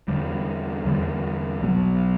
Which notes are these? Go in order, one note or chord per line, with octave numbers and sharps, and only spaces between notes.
E2 D3 G3
E2 D3 G3
B1 B2 F#3